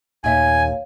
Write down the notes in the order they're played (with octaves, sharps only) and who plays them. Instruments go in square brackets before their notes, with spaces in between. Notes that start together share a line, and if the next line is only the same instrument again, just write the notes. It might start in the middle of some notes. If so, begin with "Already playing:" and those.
[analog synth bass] D#2 [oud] A#2 E5 [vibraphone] C#5 F5 [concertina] G#5